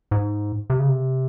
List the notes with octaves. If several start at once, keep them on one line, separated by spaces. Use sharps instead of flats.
G#2
C3
C#3
C3